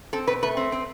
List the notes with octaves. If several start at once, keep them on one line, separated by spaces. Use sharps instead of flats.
C4 A4
B2 B4
A3 B4
C4
C4